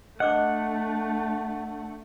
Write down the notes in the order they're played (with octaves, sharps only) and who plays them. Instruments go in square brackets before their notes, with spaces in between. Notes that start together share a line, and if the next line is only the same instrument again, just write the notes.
[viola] A3 [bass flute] D4 [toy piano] D#5 D6 [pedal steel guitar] F#5